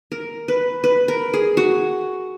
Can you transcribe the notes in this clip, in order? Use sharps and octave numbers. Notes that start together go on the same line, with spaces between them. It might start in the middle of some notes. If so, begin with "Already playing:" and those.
A#4
B4
B4
A#4
G#4
F#4